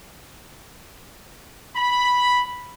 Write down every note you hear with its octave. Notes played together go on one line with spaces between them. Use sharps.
B5